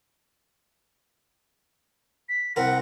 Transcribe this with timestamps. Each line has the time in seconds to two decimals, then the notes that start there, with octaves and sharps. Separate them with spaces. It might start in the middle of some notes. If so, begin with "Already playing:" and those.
2.29 B6
2.56 C2 C4 A#4 F#5